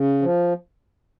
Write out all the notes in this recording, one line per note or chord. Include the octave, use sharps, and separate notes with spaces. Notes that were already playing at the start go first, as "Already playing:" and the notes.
Already playing: C#3
F3